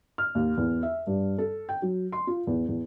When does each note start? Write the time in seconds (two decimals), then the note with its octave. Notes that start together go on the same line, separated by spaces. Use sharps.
0.18 F6
0.35 D#2
0.57 E2
0.83 E5
1.07 G2
1.38 A4
1.69 G5
1.82 F#3
2.12 C6
2.27 F4
2.47 E2
2.68 E2